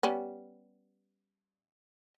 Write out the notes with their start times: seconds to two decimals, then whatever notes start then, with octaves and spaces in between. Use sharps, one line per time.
0.03 G3 B3 C#4